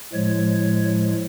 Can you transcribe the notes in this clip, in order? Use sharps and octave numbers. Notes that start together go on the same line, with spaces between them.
A2 F3 G#3 C#5